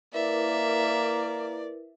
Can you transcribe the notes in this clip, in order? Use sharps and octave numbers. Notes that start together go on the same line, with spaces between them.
A#3 E4 A#4 B4 D5 E5